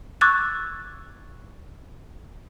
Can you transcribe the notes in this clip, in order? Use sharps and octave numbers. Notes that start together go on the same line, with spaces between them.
C#6 D6 E6 F#6 G#6 A6